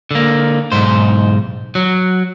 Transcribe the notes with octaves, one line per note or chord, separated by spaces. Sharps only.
D3 A#3
B1 G#2 C5
F#3